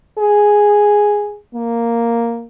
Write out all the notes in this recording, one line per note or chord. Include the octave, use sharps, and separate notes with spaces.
G#4
A#3